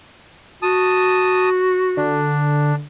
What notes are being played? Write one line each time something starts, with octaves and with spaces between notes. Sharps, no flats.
F#4 A5 D#6
D3 D4